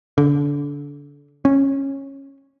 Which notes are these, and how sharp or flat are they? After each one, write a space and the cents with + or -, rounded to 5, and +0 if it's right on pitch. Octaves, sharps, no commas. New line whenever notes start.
D3 -30
C#4 -15